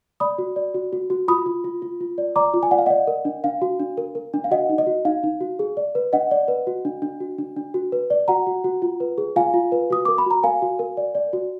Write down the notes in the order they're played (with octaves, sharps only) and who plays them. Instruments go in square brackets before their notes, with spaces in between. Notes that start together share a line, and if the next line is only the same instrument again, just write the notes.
[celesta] D5 B5 D#6
F#4
D5
F#4
F#4
F#4
F4 B5 D#6
F4
F4
F4
F4
D5
D5 A#5 D6
F4
G#5
D5 F#5
F5
D5 D#5 F#5
A#4
D4
D4 F5
F#4
D4
A#4
A#4
D4
F5
F#4 D#5 F#5
D#4
D#5
F#4
D#4 F5
D#4
F#4
G#4
D5
B4
D4 D#5 F#5
D5
B4
F#4
D4
D4
F#4
D4
D4
F#4
B4
D5
F#4 F#5 A#5
F#4
F#4
F4
B4
G#4
F4 F5 G#5
F4
B4
F#4 D#6
A#4 D6
B5
F#4 A#5
A#4 F5 G#5
F#4
A#4
D5
D5
F#4